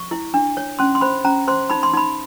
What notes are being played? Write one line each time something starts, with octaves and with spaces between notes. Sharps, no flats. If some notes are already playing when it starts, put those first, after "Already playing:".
Already playing: C#6
E4
D4
C#5
C#4 C6
C6
C5 B5
C#4 A#5
C5 C6
D#4 B5
C6
D#4 B5